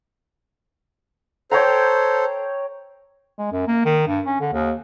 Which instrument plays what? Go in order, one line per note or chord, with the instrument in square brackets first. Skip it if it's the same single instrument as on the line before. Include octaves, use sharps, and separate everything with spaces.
[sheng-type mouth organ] A4 C5 [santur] C#5 G5 A#5
[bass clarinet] G#3
F#2
A#3
D#3
G2
C#4
D3
D#2